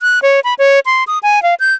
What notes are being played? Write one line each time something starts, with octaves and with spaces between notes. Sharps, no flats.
F#6
C#5
B5
C#5
C6
D#6
G#5
F5
G6